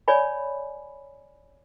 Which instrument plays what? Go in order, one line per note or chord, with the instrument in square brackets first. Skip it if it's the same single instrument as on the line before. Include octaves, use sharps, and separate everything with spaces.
[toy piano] C#5 D5 G#5 B5